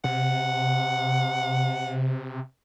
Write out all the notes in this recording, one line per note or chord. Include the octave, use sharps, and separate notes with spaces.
C3 F#5